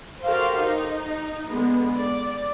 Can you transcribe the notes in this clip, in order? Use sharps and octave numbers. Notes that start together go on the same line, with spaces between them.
F#4 G4 A4 A#4 C5 F5
D#4
D3 G#3 B3
D5